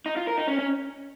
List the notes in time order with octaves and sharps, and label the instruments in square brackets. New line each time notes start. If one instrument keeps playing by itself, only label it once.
[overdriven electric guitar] D#4
F4
A#4
D#4
C#4
C#4